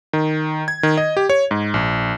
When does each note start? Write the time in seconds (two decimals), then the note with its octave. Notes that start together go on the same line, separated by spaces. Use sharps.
0.13 D#3
0.68 G#6
0.83 D#3
0.97 D#5
1.17 G4
1.30 C#5
1.51 G#2
1.74 A#1